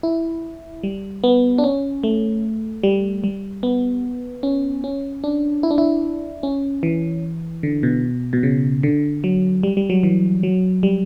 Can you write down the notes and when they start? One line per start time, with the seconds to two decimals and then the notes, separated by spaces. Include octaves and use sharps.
0.03 E4
0.83 G3
1.24 B3
1.58 D4
1.64 C#4
2.03 A3
2.83 G3
3.24 G3
3.63 B3
4.43 C#4
4.84 C#4
5.24 D4
5.63 E4
5.71 D4
5.78 E4
6.43 C#4
6.83 E3
7.63 D3
7.83 B2
8.33 B2
8.43 C#3
8.83 D3
9.24 F#3
9.63 G3
9.77 G3
9.90 F#3
10.03 E3
10.43 F#3
10.83 G3